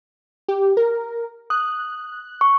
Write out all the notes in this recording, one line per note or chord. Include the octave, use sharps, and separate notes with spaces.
G4
A#4
D#6 F#6
C#6